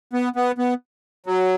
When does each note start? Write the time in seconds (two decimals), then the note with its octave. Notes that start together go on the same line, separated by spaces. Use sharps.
0.13 B3
0.36 B3
0.58 B3
1.26 F#3